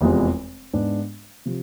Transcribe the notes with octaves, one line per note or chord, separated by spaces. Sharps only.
F1 E2 C3 F3 G#3
G#2 G#3 B3 D4
C3 F3